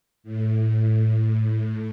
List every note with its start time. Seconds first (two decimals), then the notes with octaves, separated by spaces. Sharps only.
0.23 A2